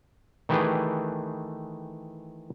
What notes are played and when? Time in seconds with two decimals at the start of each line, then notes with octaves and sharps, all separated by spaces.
0.49 D#3 E3 A3 G4 G#4 B4